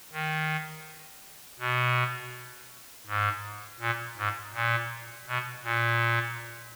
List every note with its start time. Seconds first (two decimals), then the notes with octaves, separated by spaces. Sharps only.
0.13 D#3
1.59 B2
3.07 G#2
3.80 A#2
4.17 G#2
4.54 A#2
5.27 B2
5.64 A#2